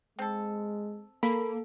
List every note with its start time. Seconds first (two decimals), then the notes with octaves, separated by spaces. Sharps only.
0.19 G#3 C4 A4
1.23 A#3 A4 B5